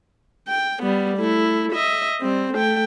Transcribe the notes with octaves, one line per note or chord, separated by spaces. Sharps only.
G5
G3 B3
A3 E4
D#5 E5
G3 C4
A3 G5